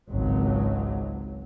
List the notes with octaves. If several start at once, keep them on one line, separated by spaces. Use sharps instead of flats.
G#1 C#2 F#3